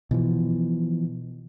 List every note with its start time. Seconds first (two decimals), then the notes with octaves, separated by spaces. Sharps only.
0.11 B2 E3 F3